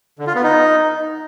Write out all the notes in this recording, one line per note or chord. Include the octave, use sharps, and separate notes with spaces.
D3
F4
B3
D#4